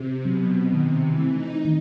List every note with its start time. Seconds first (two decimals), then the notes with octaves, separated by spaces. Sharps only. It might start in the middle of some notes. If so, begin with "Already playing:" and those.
Already playing: C3
0.25 B2 F#3 C4
0.72 C3 D#3
1.02 E3
1.18 A3 C4
1.33 D#4
1.65 D#3